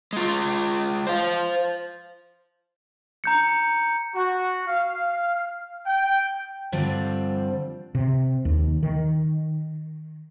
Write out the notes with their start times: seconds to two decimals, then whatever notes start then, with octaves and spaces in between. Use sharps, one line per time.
0.13 G#3 F4
1.07 C5 F5
3.24 A#5 G6 C#7
4.15 F#4
4.67 F5
5.87 G5
6.72 G2 D3 F3 G3 C4 D4
7.95 C3
8.45 D#2
8.83 D#3